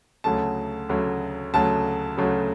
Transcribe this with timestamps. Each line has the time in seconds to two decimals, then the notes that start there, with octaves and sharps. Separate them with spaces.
0.24 D2 C#3 F#3 A3 A5
0.89 D2 C#3 F#3 A3
1.54 D2 C#3 F#3 A3 A5
2.17 D2 C#3 F#3 A3